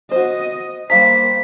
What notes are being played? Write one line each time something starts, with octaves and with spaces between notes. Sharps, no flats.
F#4 C5 D#5
G3 A#3 C5 F5 A#5 B6